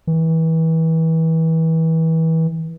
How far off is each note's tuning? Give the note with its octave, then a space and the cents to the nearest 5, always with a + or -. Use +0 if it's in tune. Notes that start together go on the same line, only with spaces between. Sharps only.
E3 -30